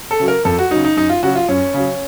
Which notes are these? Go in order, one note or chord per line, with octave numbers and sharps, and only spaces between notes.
A4
C#3 F#3
A#4
F2 A4
F#4
C#3 F#3 D#4
D#4
F#2 D#4
F4
C#3 F#3 F#4
F4
F#2 C#4
C#3 F#3